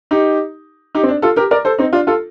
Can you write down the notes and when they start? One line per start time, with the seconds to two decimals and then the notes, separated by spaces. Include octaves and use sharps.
0.11 D#4 G4
0.95 D#4 G4
1.03 C4
1.08 D4
1.22 F4 A4
1.36 G4 A#4
1.51 A#4 D5
1.65 A4 C5
1.78 C4 D#4
1.93 D4 F4
2.07 F4 A4